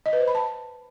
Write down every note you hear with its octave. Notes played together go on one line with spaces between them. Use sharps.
D#5
B4
C5
B5
A5